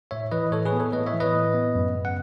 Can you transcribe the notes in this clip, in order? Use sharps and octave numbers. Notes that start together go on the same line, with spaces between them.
A2 C#5 E5
E3 B4 D#5
A2 A4 C#5
G#4 B4
B3
A4 C#5
A2 B4 D#5
C#5 E5
E3
B4 D#5
A2
B3
F#2
C#3
F#5